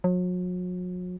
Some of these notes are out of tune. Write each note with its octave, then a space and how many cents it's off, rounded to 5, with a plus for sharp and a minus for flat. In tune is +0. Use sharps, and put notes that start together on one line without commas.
F#3 -40